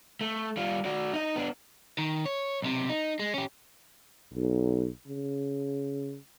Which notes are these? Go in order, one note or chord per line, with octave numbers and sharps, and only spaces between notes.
A3
G3 F4
F#4 D5
D#4 D#5
B3 D4
D#3
C#5
B1 C3
D#4
G#3
C#4 G4
B1
C#3